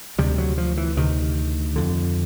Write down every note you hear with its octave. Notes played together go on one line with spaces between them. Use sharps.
D2 C3 G3
F#3
F3
E3
D2 C3 D#3
F2 D3